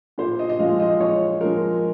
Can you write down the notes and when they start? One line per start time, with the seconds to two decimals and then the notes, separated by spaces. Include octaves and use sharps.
0.18 A#2 C5
0.39 D#5
0.49 D#5
0.59 F3 G#3 F5
0.80 D#5
1.00 A#2 C#5
1.41 F3 G#3 A#4